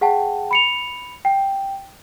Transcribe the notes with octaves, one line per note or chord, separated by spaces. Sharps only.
G#4 F#5 G5 A5
B5 C#7 F7
G5